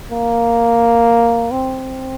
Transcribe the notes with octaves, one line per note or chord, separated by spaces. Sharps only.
A#3
C4